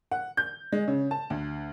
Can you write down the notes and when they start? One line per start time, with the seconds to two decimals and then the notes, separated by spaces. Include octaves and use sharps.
0.11 F#5
0.37 G6
0.72 G#3
0.88 C#3
1.11 A5
1.30 D2